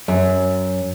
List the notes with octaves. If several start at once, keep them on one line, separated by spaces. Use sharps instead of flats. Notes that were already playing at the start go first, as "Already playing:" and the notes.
F#2